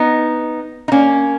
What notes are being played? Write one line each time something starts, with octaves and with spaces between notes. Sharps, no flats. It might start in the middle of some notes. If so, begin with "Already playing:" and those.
Already playing: B3 D#4
D#4
A#3 C#4